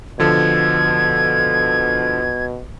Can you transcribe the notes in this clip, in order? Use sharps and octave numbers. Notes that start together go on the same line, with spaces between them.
B2 D3 F3 A4 G#6